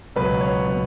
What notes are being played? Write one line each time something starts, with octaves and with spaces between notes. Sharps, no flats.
C#2 B2 F#3 B3 B4
C#5
B2 F#3 B3